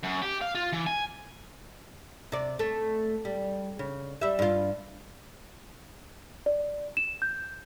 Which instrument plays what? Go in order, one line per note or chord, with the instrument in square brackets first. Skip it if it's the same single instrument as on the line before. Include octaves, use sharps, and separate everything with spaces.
[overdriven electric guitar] F#2
G4
F5
F4
E3
G#5
[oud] C3 D5
A3
G3
C#3
G3 E5
G2 F4
[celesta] D5
E7
G6